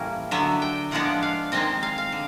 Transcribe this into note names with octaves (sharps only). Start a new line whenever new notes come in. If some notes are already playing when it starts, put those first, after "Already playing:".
Already playing: A2 E3 G3 A#3 C#4
D3 F#3 B3 E5
G5
A2 F3 G#3 B3 D4 F#5
F5
D#3 G#3 C4 D#5
F5
F5
D3